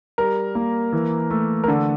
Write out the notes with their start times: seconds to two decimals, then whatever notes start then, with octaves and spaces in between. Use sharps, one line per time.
0.18 G3 A#4
0.55 A#3
0.93 E3
1.30 A3
1.64 A#4
1.68 D3 A4